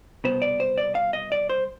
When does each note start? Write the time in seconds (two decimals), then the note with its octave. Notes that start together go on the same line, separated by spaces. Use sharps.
0.24 C2 B2 B3 C5
0.42 D5
0.60 C5
0.78 D5
0.95 F5
1.13 D#5
1.32 D5
1.49 C5